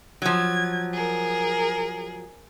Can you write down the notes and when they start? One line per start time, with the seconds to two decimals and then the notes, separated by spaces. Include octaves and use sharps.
0.22 F3 F#3 G#6
0.93 G#4 A#4